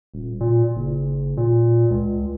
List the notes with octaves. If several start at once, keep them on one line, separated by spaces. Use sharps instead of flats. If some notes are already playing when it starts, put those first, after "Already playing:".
D#1
A#2
F#1
A#2
C#2